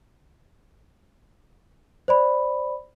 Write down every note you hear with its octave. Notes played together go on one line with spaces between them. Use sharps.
C5 D5 B5